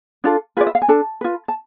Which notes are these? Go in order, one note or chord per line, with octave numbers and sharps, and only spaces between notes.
D4 F4 A4
F4 G#4 B4 D5
E5
F5
G#5
D4 A4 A5
F4 B4
A5